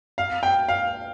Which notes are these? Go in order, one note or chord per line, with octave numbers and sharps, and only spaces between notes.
F5
G5
F5